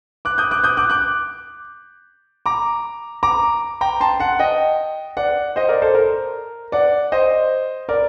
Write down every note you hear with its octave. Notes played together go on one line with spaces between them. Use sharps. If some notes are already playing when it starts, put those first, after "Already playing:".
D6 F#6
D#6 G6
D6 F#6
D#6 G6
D6 F#6
D6 F#6
A#5 D6
A#5 D6
G5 A#5
A5 C6
F#5 A5
D#5 G5
D5 F#5
C5 D#5
A#4 D5
A4 C5
A#4
D5 F#5
C5 D#5
A#4 D5